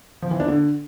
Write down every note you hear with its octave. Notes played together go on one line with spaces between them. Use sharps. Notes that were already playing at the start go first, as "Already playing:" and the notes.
F3
E3
D4
D3